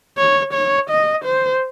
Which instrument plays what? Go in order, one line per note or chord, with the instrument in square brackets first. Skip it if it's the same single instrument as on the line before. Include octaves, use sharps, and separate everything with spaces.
[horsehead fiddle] C#5
C#5
D#5
C5